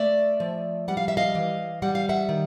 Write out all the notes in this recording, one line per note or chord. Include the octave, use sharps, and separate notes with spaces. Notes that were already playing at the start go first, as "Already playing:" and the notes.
Already playing: A3 D5 E5
F3
G3 F#5
F5
E5
D#5 F5
E3
G3 F#5
F5
E5 F#5
D#3